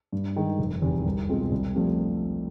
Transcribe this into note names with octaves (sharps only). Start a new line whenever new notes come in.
G2
D#3 G#3
F1
E2 C3
C2
B2 G#3 C4 F4
C2
C3 F3 A3 D4